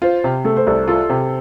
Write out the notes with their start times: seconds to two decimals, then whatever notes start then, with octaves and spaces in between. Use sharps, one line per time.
0.02 F4 C5
0.24 C3
0.45 A3 A4
0.57 C5
0.67 C2 A4
0.88 F4 A4
1.09 C3